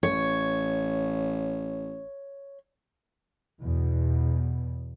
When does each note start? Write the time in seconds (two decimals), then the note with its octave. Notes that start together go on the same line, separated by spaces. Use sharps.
0.03 A1 C#5
3.60 E2 B2